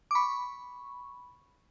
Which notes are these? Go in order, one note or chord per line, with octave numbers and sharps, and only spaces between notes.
D6
B5 C#6